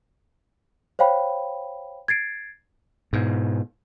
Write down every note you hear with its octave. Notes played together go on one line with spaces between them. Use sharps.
C5 C#5 F5 G5 B5
G#6 A6 C7 D7
G#2 B2